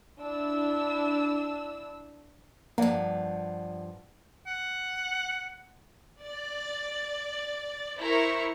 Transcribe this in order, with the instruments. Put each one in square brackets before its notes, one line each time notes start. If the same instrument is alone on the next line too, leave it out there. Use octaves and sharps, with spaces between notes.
[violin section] D4 E4 E6
[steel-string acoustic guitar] G2 F3 [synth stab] A#3 [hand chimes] D5 F#5
[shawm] F#5
[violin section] D5
E4 A#4 C5 C#6